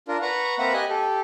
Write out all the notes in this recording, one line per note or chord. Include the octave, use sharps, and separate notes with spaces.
D4 F4 A#4
B4 F#5 A#5 C#6
A#3 C4 B4 E5 F#5 A#5
G4 D#5 G#5 F#6
G4 A4